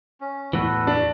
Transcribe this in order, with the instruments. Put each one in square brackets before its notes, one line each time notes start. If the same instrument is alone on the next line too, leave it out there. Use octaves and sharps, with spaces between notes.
[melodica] C#4
[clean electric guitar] E2 A2 E3 [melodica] F#4 A4 B4
[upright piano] D4